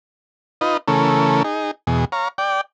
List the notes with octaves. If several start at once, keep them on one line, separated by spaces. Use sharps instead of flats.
D#4 F4 B4 D#5
C#3 E3 A3 C#4 A4 A#4
D#4 G#4
E2 B2 G#4
C#5 F5 A#5
D5 G5